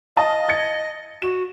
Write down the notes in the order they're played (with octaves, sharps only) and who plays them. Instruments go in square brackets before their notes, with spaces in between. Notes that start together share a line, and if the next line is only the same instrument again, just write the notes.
[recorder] D#5 [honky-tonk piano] F5 A5 D#6
[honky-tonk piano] G#6 A6 C#7
[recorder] F#4 [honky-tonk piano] E7